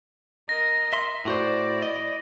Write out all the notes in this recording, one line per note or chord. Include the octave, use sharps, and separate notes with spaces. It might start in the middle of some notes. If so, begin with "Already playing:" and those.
A#4 D#5 A#6
E5 C6
A2 E4 F#4 C5 D5
D#5